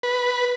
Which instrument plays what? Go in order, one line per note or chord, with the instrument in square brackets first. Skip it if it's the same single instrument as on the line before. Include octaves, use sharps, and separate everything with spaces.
[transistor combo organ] B4